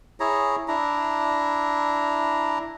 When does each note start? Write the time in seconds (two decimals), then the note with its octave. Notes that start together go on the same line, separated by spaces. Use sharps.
0.20 E4 G#4 C#5 A#5
0.68 D4 E4 A#5